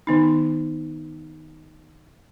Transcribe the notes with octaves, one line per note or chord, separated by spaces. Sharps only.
D#3 B3 D#4